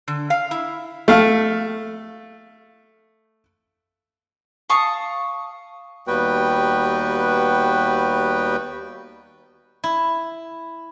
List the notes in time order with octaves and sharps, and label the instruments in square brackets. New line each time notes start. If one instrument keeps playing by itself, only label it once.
[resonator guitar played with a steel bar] D3
F5
E4
[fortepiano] A3 F5
[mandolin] F5 A5 C#6 D#6
[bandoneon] D#2 G3 B3 F#4 B4 G5
[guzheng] E4